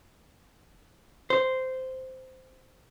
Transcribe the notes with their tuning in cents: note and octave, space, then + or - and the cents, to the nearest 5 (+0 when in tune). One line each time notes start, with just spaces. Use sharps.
C5 -10